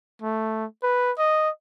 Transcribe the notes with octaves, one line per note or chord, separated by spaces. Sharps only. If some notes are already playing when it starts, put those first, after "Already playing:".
A3
B4
D#5